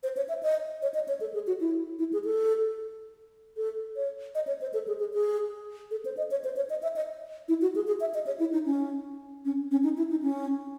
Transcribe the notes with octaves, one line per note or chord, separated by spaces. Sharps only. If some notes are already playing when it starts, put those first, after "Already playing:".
C5
C#5
E5
D#5
C#5
D#5
C#5
A4
G#4
F#4
E4
E4
G#4
A4
A4
C#5
D#5
C#5
C5
A4
G#4
G#4
G#4
A4
C5
D#5
C#5
C5
C#5
D#5
E5
D#5
E4
F#4
G#4
G#4
E5
D#5
C#5
E4
D#4
C#4
C#4
C#4
D#4
E4
D#4
C#4